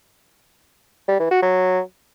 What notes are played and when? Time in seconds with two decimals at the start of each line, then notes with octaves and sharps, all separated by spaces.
1.08 G3
1.20 E3
1.31 F#4
1.42 F#3